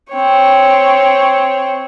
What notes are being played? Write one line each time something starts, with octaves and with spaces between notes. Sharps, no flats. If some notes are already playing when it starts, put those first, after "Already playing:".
C4 C#5